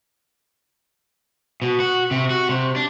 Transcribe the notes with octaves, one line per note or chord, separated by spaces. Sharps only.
B2
F#4
C3
F#4
C3
D4